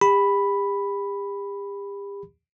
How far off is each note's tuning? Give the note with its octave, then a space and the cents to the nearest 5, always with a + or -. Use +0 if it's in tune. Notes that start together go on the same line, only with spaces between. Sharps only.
G4 +40 B5 +0